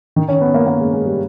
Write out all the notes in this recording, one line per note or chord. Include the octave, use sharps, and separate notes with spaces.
D#3
C#4
B3
A#3
A#3
G#3
G#3
G3